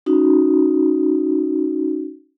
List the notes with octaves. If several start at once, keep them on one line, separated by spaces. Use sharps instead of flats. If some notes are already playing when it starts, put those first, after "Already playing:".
C#4 D#4 F#4